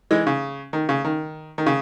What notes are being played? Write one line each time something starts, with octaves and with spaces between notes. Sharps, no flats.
E3 G#3
C#3
D#3
C#3
D#3
D#3
C#3